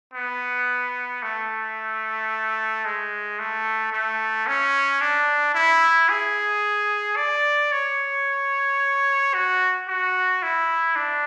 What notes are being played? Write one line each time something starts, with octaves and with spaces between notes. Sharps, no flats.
B3
A3
G#3
A3
A3
C#4
D4
E4
G#4
D5
C#5
F#4
F#4
E4
D4